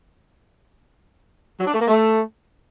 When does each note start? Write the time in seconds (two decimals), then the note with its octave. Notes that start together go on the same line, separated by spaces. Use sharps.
1.59 F#3
1.66 D4
1.74 A3
1.81 A#3
1.88 A3